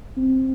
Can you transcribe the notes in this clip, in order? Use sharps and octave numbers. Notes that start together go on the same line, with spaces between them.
C4